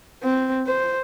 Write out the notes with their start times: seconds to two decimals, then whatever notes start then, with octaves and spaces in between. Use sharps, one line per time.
0.23 C4
0.67 C5